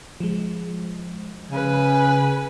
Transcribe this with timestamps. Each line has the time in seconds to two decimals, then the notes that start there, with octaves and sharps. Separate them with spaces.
0.20 F3 G#3
1.51 C#3 B4 G#5